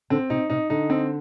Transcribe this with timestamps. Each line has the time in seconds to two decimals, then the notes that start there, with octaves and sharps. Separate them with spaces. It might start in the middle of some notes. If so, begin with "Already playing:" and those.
0.10 D3 C4
0.30 C3 D#4
0.50 C3 D#4
0.70 D3 D#4
0.90 C4